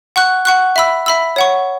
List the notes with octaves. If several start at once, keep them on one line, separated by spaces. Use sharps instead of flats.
F#5 C#6 F#6
F#5 C#6 F#6
E5 B5 E6
E5 B5 E6
C#5 F#5 C#6